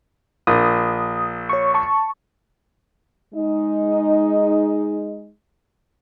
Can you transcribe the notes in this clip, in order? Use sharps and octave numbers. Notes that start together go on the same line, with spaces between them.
A#1 D#6
C#5 C#6
A5 C#6
G#3 D#4